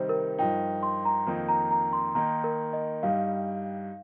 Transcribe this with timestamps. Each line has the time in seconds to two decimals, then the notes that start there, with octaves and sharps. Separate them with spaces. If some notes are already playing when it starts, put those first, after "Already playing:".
Already playing: C3 D#3 G3 D#4 C5
0.09 A#4
0.39 G2 F3 D#4 G5
0.83 C6
1.05 A#5
1.27 F2 D#3 A#3 D#4
1.49 A#5
1.71 A#5
1.93 C6
2.15 D#3 A#3 D#4 A#5
2.44 A#4
2.73 D#5
3.03 G2 G3 D#4 F5